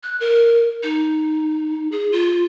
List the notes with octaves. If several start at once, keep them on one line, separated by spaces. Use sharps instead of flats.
F#6
A#4
D#4
G#4
F4